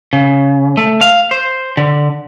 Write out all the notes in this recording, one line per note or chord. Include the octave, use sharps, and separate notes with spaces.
C#3
A3
F5
C5
D3